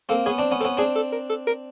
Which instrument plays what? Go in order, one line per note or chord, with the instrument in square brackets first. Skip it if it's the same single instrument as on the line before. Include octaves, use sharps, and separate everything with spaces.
[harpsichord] A#3 C4 [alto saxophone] A4
[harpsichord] B3 C#4 [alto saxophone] G#4
[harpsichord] C4 D4
B3 C#4
[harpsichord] C4 [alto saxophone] A4
[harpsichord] B3 C#4
[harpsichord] C4 D4 [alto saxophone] G#4
[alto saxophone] A4
A#4
A4
A#4